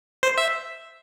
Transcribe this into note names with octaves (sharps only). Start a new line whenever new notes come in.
C5
E5